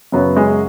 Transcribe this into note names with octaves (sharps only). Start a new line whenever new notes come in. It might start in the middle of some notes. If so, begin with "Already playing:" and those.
F#2 C#3 F#3 B3
G#3